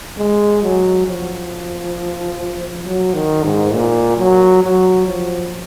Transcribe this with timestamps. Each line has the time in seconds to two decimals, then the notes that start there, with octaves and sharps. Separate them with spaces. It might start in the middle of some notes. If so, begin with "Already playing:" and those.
0.18 G#3
0.62 F#3
1.07 F3
2.85 F#3
3.14 D#3
3.44 G#2
3.74 A#2
4.18 F#3
4.63 F#3
5.07 F3